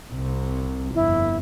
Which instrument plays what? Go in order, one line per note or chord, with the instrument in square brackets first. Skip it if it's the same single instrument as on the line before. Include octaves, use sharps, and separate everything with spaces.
[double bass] C2 C3
[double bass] G1 F2 [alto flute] E4